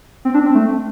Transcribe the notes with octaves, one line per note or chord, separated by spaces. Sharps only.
C4
D4
C4
A3